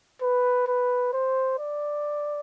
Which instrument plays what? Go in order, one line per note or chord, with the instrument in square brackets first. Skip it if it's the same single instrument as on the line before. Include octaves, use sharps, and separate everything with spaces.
[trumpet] B4
B4
C5
D5